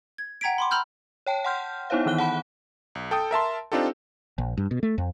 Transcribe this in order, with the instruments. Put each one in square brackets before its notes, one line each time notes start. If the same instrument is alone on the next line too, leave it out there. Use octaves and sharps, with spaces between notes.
[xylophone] G#6
F#5 G5 A#5 G#6 B6 D7
B5 C6 D6
A#5 B5 E6 F6 G6
[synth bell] C#5 G5 A5
F#5 G5 C6 F6 G6
B3 D#4 E4 C5 C#5 F5
D#3 E3 B3 F#6 G7
F#5 A5 B5
[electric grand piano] B1
A4 G5 D#6
A#4 E5 A5 C6
C4 D4 D#4 F4 G4 A4
[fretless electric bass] A#1
G2
B2
A3
F2